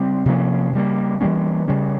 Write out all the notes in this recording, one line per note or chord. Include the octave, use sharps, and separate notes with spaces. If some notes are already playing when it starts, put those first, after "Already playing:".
Already playing: C#3 G3 C4
C3 F3 A#3 C#4
C#3 G3 A#3
E3 G3 A#3 C#4
C#3 G3 C#4